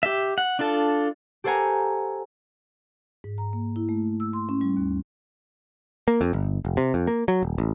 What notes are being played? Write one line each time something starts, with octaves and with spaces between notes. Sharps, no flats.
G4 E5
F#5
D4 F4 A4 A5
G4 A4 C5 F#5 G#5 A#5
G#2
A#5
A#3
E4
A3
E6
C6
C#4
G3
D#2
A#3
F2
G1
F1
C3
F2
A#3
F#3
D#1
A1